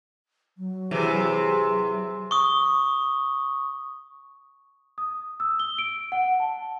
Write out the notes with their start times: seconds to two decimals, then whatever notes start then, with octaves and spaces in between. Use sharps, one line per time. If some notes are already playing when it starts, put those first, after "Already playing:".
0.58 F#3
0.91 C3 E3 G4 G#4
2.31 C#6 D#6
4.98 D#6
5.40 E6
5.60 G7
5.78 D7
6.12 F#5
6.40 A5